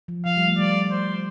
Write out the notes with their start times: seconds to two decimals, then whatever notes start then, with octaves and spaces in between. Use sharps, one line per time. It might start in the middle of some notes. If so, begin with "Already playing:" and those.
0.08 F3
0.25 F3 F5
0.37 G3
0.47 A3
0.58 G3 D5
0.91 C5